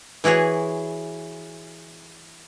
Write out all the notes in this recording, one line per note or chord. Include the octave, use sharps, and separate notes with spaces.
E3 E4 F#4 G#4 C#5